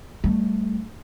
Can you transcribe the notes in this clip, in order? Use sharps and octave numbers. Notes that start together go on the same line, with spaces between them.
G3 A3